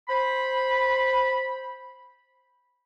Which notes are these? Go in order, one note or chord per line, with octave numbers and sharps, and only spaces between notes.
C5 B5